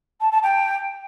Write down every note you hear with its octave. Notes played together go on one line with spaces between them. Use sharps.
A5
A5
G5